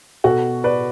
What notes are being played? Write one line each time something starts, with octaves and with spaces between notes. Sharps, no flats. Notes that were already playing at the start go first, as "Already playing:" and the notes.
B2 F#4 A4
B4 D5